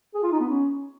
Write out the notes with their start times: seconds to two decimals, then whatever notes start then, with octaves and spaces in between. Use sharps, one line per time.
0.15 G#4
0.23 F4
0.32 D#4
0.40 B3
0.49 C#4